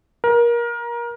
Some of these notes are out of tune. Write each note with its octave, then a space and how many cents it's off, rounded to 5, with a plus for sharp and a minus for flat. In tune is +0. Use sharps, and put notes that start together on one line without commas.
A#4 +25